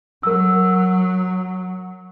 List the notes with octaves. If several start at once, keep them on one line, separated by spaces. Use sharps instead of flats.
F#3 A#4 E6